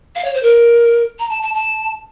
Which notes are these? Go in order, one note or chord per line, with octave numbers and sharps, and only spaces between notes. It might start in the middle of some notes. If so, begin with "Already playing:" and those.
F5
C#5
C5
A#4
A#5
A5
A5
A5